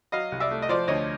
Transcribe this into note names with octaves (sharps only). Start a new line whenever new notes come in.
F#3 D#5 F5
C2
D5 E5
A3
D#5
F3 C5 D5
D2 C#5 D#5